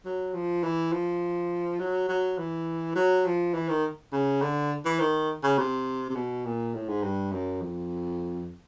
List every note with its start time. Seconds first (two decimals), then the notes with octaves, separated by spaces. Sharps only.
0.05 F#3
0.34 F3
0.64 E3
0.93 F3
1.80 F#3
2.09 F#3
2.38 E3
2.96 F#3
3.26 F3
3.54 E3
3.69 D#3
4.12 C#3
4.42 D3
4.86 E3
5.00 D#3
5.44 C#3
5.59 C3
6.10 C3
6.16 B2
6.46 A#2
6.75 A2
6.89 G#2
7.03 G2
7.32 F#2
7.62 F2